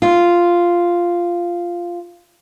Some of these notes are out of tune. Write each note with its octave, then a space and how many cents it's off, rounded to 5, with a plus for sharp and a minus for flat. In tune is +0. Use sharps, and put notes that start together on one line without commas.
F4 -5